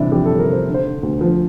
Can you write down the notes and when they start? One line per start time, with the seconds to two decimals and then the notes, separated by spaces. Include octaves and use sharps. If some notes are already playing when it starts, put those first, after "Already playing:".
Already playing: G1 C3 E3 D4 E4
0.11 F2 G4
0.26 A4
0.30 G1
0.39 A#4
0.48 C3 C5
0.66 D3
0.74 C5
0.85 D3
1.03 D2
1.21 F3